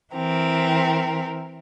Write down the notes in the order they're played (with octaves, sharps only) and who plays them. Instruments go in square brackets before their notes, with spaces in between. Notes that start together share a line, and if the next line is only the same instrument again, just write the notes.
[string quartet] E3 C4 A#4